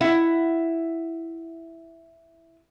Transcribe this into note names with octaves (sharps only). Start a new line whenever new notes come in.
E4 E5 F#5